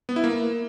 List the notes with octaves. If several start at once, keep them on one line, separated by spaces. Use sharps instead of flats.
B3
E4
A#3